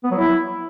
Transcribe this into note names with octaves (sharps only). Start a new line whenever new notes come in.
B3
F#3
E4